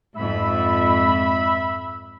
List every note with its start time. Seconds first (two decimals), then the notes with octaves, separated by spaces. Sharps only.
0.16 F2 G#2 E5 B5